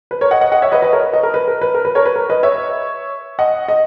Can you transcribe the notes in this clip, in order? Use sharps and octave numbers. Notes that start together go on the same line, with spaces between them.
B4
A#4 C#5
D#5 F#5
D#5 F#5
D#5 F#5
C#5 E5
B4 D#5
B4 D#5
A#4 C#5
B4 D#5
A#4
B4
A#4
B4
A#4
B4
A#4 C#5
B4
A#4
B4 D#5
C#5 E5
D#5 F#5
D#5